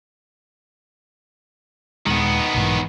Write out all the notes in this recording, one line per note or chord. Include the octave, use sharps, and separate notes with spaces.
D#1 D#3 G#3 B3
B1 G#2 E3